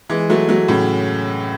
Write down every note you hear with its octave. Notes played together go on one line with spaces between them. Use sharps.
E3 G#3
F#3 A3
F#3 A3
A2 C#3